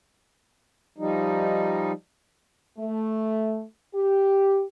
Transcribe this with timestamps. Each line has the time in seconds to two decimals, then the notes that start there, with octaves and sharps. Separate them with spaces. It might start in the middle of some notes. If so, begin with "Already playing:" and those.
0.98 F3 G3 D#4
2.79 A3
3.94 G4